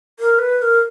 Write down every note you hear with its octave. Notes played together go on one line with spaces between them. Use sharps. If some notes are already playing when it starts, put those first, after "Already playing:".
A#4
B4
B4
A#4